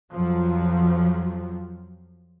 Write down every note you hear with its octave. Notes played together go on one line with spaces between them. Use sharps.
F2 F3 F#3